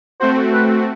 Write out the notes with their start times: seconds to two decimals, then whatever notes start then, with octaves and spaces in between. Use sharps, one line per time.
0.20 A3 C4 F#4 C5
0.53 B4